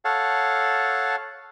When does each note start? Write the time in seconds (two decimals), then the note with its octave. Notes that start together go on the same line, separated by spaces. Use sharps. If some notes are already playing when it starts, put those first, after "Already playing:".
0.05 A4 C#5 F5 F#5 A5